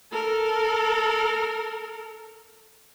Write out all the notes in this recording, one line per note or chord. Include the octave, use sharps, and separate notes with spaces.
A4 A#4